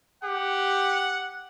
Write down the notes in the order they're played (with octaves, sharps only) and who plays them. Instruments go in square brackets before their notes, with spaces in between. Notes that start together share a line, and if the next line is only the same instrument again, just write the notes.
[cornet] G4 [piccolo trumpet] F#5